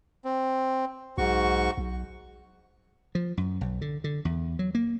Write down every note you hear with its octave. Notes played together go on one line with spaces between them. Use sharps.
C4
B1 G#2 F#4 C#6
B1
F3
F#2
B1
D3
D3
E2
F#3
A#3